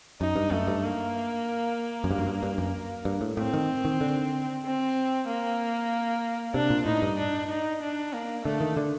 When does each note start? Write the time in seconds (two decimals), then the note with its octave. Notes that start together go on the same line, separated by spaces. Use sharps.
0.21 F#2 D#4
0.36 G2
0.51 F#2 A3
0.67 G2
0.84 A#3
2.04 F#2
2.11 G2
2.18 F#2
2.27 G2
2.43 G2
2.58 F#2
3.05 G2
3.21 A2
3.37 A2 C4
3.54 D#3
3.85 D#3
4.01 D3
4.65 C4
5.27 A#3
6.54 C3 D4
6.70 A#2
6.86 A2 D#4
7.02 G2
7.19 D4
7.49 D#4
7.82 D4
8.13 A#3
8.45 D3 A3
8.61 D#3
8.77 D3